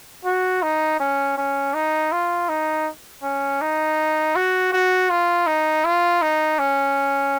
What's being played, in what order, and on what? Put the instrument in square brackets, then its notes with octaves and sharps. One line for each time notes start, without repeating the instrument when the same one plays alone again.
[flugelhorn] F#4
D#4
C#4
C#4
D#4
F4
D#4
C#4
D#4
F#4
F#4
F4
D#4
F4
D#4
C#4